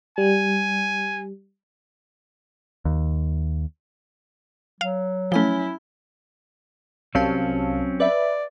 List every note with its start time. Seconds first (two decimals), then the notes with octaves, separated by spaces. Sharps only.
0.18 G3 G#5
2.85 D#2
4.81 F#3 F5
5.32 F3 A3 C#4 E4 G#5 G7
7.15 C2 F#3 C4 C#4 F5 A5
8.00 B4 D5 E5